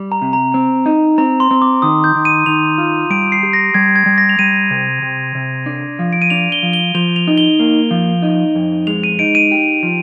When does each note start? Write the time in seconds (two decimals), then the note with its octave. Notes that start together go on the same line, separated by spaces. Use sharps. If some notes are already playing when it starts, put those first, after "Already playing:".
Already playing: G3
0.12 A#5
0.22 C3
0.33 A#5
0.54 C4
0.86 D#4
1.18 C4 A#5
1.40 C6
1.51 C4
1.62 D6
1.82 D#3 D#6
2.04 G6
2.15 D#3
2.25 D#7
2.46 D#3 F7
2.78 F4
3.10 G3 D7
3.32 C7
3.43 G4
3.53 A#6
3.74 G3 G#6
3.96 G#6
4.06 G3
4.18 A#6
4.29 F7
4.39 G3 D#7
4.71 C3
5.02 C3
5.35 C3
5.66 D4
5.99 F3
6.13 D7
6.22 D#7
6.30 D4 F7
6.52 G7
6.63 F3
6.73 G7
6.95 F3 F7
7.16 F7
7.27 D#4
7.38 G7
7.60 A#3
7.91 F3
8.22 D#4
8.55 F2
8.87 G#3 F7
9.04 D#7
9.19 D#4 D7
9.35 D#7
9.51 G4
9.83 F3